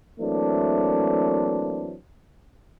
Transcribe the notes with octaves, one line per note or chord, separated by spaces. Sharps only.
E3 F#3 A3 A#3 C4 D4